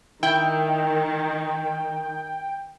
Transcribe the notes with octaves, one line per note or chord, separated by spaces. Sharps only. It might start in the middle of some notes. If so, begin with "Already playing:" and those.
D#3 E4 G5